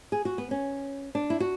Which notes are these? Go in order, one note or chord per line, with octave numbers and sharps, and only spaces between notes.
G#4
F#4
B3
C#4
D4
E4
F#4